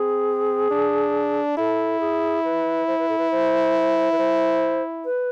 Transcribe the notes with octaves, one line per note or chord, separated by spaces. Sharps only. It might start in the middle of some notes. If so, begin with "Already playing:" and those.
Already playing: C4 G#4
D4
E4 A4
G#4
B4
C5
B4
A4
B4
C5
B4
C5
B4